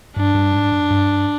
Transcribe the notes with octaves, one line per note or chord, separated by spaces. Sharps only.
G2 D4
G2
G#2
F#2
G2